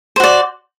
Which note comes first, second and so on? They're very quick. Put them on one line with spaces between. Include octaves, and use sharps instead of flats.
C5 F#4 D5